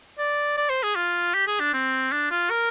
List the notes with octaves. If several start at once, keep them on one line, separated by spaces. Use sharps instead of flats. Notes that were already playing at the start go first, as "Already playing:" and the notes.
D5
D5
C5
G#4
F4
G4
G#4
D4
C4
D4
F4
A#4